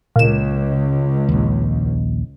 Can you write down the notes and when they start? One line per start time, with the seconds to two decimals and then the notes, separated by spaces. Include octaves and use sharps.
0.16 C#2 A#2 E7
1.29 A#1 D#2